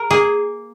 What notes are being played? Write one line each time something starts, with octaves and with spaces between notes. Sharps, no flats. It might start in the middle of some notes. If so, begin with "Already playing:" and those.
Already playing: A#4
A#3 G#4